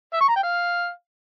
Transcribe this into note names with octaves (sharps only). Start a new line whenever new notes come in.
E5
C#6
A#5
G5
F5